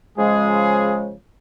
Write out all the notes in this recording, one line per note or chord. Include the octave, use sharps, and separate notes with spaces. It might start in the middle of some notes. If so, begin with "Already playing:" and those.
C#3 F3 G#3 G#4